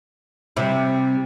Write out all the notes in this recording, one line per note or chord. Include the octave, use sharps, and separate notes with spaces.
C3 G3 E4